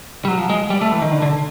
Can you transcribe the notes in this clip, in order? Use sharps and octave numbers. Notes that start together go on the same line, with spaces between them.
G3
F#3
F3
G#3
G3
A3
E3
D#3
D3
D3